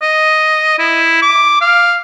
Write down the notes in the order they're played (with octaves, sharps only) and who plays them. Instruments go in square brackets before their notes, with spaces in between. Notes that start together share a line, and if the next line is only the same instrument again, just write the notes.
[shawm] D#5
E4
D6
F5